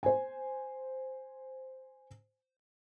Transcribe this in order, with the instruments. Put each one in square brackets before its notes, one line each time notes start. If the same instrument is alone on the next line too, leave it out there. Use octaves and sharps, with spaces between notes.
[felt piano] C5 G#5